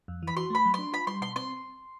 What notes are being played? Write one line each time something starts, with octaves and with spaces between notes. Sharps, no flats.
F2
E3 B5
F#4 C6
A3 B5
F#3
D4 C6
F4 B5
G3 C6
B2 C6
C4 C6